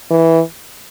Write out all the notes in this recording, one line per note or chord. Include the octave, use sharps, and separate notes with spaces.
E3